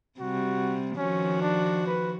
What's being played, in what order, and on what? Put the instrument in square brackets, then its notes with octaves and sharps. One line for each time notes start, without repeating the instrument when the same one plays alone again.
[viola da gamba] C3 G3 [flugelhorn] F#4
[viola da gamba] D#3 F3 F#4 [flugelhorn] C#4
[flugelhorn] D4
B4